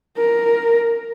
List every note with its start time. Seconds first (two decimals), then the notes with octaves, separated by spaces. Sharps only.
0.17 A#4